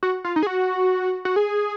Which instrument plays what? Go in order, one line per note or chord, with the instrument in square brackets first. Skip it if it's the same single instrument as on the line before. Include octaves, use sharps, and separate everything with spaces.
[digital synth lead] F#4
F4
D#4
G#4
F#4
F#4
G#4